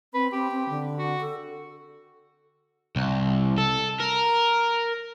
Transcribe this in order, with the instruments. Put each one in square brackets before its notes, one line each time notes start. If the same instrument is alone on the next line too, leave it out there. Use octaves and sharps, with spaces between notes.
[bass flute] C4 [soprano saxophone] B4
[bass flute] C4 [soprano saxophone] G4
[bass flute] C4
D3
[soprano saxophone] F#4
[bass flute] A4
[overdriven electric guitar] C2
A4
A#4